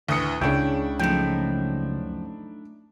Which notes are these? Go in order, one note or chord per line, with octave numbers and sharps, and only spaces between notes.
D2 A2 B4 D#6 C#7
C#2 C#3 D4 E4 C#5 G5
F#2 F3 A3 D#4 G5